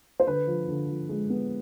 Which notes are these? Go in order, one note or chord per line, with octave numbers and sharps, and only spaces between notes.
C5
D3 B4
F3
D3
F3
G#3
B3